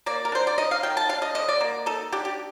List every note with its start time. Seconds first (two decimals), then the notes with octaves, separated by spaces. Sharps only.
0.06 A#3 D5
0.25 A#4
0.32 D4 C5
0.47 D5
0.58 D#4 D#5
0.71 F5
0.83 D#3 G5
0.97 A5
1.09 D4 F5
1.22 D#5
1.35 D3 D#5
1.48 D5
1.61 A#3
1.86 D#4 A4
2.12 D4 G4
2.25 G4